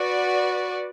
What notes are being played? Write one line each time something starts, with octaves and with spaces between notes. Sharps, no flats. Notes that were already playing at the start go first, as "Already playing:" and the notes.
Already playing: F#4 B4 D5